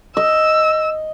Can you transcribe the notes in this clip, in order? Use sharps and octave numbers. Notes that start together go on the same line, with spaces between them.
D#5 E6